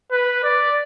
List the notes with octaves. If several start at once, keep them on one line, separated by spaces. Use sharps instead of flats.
B4
D5